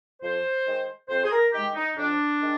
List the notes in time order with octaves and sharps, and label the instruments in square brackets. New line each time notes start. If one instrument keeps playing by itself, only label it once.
[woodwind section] F2 C5
D#3 G#3
F2 C5
G#4
A#4
D#3 G#3 G4
D#4
F2 D4
D#3 G#3